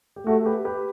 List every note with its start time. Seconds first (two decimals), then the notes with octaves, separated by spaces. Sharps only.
0.16 G4
0.26 A3 F#4 A4
0.46 G4 B4
0.65 G4 B4